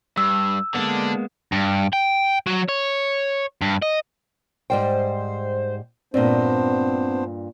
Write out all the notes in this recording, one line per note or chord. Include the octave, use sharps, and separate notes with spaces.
G2 E6
D3 G#3 A#3 B3 D4
G2
G5
F#3
C#5
G2
D#5
G#2 G3 C5 G5
G2 A#2 B3 C4 D4 C5